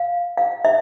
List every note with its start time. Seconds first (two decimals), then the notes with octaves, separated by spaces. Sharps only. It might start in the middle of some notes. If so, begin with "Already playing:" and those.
Already playing: F5
0.37 F5
0.65 E5